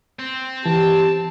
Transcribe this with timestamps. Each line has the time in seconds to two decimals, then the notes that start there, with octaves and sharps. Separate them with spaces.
0.19 C4
0.66 E3 G4 A5